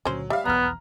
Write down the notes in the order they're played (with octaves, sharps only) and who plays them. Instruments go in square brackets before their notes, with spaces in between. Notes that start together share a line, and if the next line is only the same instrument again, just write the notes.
[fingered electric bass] C#2 A#2 D3 [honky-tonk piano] F#3 [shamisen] C#4 C5
[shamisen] G3 [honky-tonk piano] E5 F5
[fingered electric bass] F1 B1 E2 [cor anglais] B3 [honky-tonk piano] A#5 F6